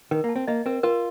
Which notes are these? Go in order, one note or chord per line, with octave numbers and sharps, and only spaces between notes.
D#3 A#4
A#3
A5
C4
A#3 D#5
C4 A#4
F4 A#4